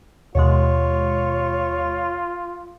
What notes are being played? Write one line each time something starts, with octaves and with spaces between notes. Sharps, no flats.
D#2 B2 G#3 F4 C#5